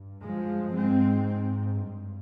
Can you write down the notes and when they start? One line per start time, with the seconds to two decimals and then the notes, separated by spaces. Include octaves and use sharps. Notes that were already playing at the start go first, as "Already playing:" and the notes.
Already playing: G2
0.25 F3 G#3
0.76 G#2 G#3 C4
1.79 G2